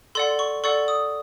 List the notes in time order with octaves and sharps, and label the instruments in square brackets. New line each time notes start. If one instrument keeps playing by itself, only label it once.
[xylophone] A4 D5 F#5 C6
C#6
A4 D5 F#5 C#6
D#6